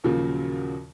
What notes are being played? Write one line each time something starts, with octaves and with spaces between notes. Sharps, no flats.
D#2 A#2 C#3 F3 F#3 A#3